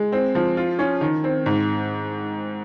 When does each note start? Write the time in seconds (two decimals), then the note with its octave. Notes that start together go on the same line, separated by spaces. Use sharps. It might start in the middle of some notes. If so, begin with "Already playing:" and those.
Already playing: G#3
0.12 C4
0.35 F3
0.57 F4
0.79 C#4
1.01 D#3
1.24 C4
1.46 G#2